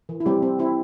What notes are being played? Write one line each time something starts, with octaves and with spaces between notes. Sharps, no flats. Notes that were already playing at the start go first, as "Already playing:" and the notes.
E3
E4
G3 C4 G4
C4
C4 E4